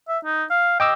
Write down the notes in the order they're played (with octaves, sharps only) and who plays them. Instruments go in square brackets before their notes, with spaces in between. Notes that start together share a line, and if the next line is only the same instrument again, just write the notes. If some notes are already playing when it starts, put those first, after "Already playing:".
[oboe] E5
D#4
F5
[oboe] D#5 [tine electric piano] G5 D6 E6